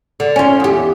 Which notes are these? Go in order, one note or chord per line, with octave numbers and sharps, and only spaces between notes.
D3
C#4 F4
E2 G4